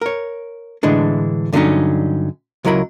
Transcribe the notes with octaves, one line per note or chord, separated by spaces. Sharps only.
A#4 C#5
A2 D3 E3 G#3 D4
G2 D3 F#3 A3 C#4 D#4
C#2 F#3 E4 A#4 B5